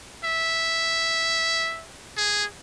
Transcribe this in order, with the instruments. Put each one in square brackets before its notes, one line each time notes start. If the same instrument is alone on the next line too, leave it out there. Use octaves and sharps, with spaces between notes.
[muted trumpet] E5
G#4